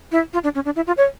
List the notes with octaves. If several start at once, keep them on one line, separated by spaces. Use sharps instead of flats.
E4
F4
D4
C#4
D4
E4
F4
C#5